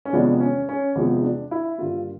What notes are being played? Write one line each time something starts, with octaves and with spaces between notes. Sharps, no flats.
C#4
E2 C3 F3 G#3 B3 D4
C#4
C#4
E2 C3 F3 G#3 B3
D4
E4
G2 D3 G3 A#3 F4